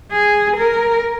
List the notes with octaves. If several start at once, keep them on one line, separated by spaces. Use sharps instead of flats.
G#4
A#4